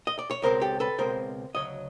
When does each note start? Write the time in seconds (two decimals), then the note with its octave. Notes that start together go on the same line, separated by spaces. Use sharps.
0.07 D#5
0.19 D5
0.31 C#5
0.42 C#2 B2 G#3 C4 A#4 C5
0.61 G4 A4
0.80 A4 B4
0.98 C#2 B2 G#3 C4 A#4 C5
1.55 D2 C#3 F#3 C#5 D#5